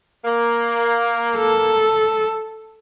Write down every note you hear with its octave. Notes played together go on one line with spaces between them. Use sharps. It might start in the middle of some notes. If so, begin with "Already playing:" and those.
A#3
A4